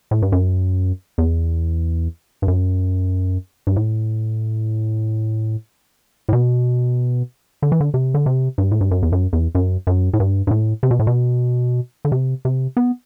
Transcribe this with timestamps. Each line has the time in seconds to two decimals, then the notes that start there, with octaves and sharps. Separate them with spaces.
0.11 A2
0.22 G2
0.32 F#2
1.18 E2
2.42 G2
2.48 F#2
3.67 G2
3.76 A2
6.29 A2
6.33 B2
7.62 D3
7.72 E3
7.80 D3
7.94 C3
8.14 D3
8.26 C3
8.58 G2
8.71 A2
8.81 G2
8.91 F#2
9.03 E2
9.12 F#2
9.33 E2
9.55 F#2
9.87 F#2
10.13 A2
10.20 G2
10.47 G2
10.51 A2
10.83 C3
10.91 B2
10.99 A2
11.07 B2
12.05 D3
12.12 C3
12.45 C3
12.77 B3